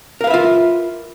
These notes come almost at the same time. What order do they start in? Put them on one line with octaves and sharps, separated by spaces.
A#4 F5 B4 E5 F4